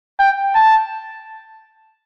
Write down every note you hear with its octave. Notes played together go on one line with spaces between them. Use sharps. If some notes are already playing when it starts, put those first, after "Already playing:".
G5
A5